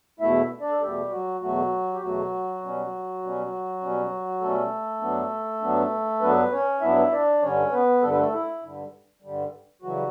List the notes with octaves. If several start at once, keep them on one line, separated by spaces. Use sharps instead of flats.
E2 B2 A3 E4 E5
D4 D5
A4
E2 B2 G3 A3 G4
F#3 F#4
E2 B2 F#3 A3 F#4
G4
E2 B2 F#3 A3 F#4
B2 G3 C#4
B2 G3 C#4
B2 G3 C#4
B2 G3 A3 C#4 A4
G2 F#3 B3 D4
G2 F#3 B3 D4
G2 F#3 B3 D4 B4
C#4 C#5
G2 F#3 B3 D4 E4 E5
D4 D5
G2 D3 G3 C#4 C#5
B3 B4
G2 D3 G3 A4
B4
A3 A4
E4
G2 D3 G3
G2 D3 G3
C#3 E3 F#3 G3 F#4